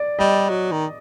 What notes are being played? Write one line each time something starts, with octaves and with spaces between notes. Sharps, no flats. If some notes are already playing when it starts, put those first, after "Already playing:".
Already playing: D5
G3 D#5
F#3
D#3